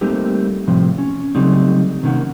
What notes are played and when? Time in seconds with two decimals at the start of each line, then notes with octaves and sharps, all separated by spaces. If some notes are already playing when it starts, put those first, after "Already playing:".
0.01 G3 A3 A#3 C4 D#4 G4
0.68 A2 C3 F3
0.98 C#4
1.35 C#3 F#3 G3 A3 C4 D#4
2.03 C3 D#3 A#3 C#4 D#4 F#5